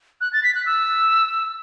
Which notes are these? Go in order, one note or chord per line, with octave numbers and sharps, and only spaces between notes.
F#6
A6
B6
F#6
E6